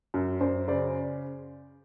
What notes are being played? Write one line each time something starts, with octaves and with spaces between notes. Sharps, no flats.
F#2
F#2 C5 D5
C#3 C5 D5